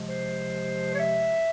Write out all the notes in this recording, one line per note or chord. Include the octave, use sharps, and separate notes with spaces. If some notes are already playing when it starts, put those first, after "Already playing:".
Already playing: C3 F3 G#3
C5
C#5
E5